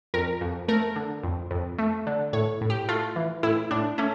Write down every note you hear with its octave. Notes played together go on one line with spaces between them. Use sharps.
F2 A#4
F2
A3 A#4
D3
F2
F2
A3
D3
A2 C#5
A2
G4
A3 F4
E3
A2 E4
A2 D4
A3 C#4